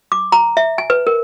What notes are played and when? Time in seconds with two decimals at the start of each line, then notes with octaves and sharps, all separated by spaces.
0.12 D6
0.32 A#5
0.57 E5
0.78 G#5
0.90 B4
1.07 A#4